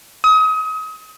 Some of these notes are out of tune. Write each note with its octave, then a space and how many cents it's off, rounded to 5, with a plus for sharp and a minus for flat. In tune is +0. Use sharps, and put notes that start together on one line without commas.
D#6 +35